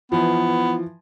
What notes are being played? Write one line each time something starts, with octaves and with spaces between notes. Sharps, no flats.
E3 F3 B3